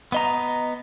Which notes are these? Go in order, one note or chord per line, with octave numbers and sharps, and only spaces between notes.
B3 D#5 A#5